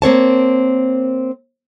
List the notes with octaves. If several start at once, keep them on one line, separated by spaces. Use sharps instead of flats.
A#3 C4 C#5 A5